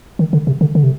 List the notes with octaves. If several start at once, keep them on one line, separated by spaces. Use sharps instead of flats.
D#3
D3
C3
D3
D3
C3